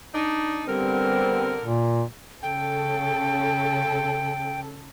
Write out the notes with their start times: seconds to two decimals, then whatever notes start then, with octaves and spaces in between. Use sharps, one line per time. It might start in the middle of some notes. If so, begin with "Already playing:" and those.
0.14 D4 D#4
0.67 D3 G3 B3 C4 A#4
1.64 A#2
2.43 C#3 A4 G5